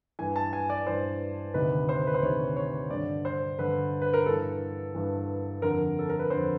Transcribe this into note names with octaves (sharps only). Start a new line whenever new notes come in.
G2 E3 G#5
A5
G#5
D5
G2 E3 C5
D2 C3 D#3 B4
C5
B4
C5
D2 C3 D#3 C#5
C#5
G2 D3 D5
C5
G2 D3 B4
B4
A#4
G2 E3 A4
G2 E3
F2 D3 A#4
A4
A#4
B4
F2 D3 C5